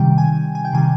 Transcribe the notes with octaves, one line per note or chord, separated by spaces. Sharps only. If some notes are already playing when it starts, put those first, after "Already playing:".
Already playing: C3 D#3 G3 G5
G#5
G#5
G5
C3 D#3 G3 G#5